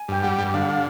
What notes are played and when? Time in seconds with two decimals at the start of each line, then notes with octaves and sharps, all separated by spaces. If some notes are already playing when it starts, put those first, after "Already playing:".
Already playing: G#5
0.08 G2 G5
0.23 G3 F#5
0.38 G2
0.54 D3 F5
0.61 F#5
0.69 F5